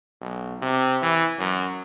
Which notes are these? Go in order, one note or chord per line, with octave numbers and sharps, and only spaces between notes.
B1
C3
E3
F#2